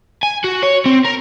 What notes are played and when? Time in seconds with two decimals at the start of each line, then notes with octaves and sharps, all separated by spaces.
0.23 G#5
0.44 F#4
0.63 C#5
0.86 C4
1.05 A#4